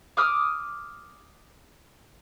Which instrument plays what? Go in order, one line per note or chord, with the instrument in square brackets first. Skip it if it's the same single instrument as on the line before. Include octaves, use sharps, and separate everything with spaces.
[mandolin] D6 D#6 F6